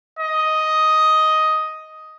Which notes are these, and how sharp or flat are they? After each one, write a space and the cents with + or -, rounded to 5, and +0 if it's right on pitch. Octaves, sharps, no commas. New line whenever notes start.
D#5 +5